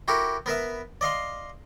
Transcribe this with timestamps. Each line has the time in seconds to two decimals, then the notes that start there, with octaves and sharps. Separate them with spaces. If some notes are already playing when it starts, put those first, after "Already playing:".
0.08 E4 F#4 G4 A4 A#4
0.46 B3 A#4 B4 E5
1.01 D5 D#5 F5 C6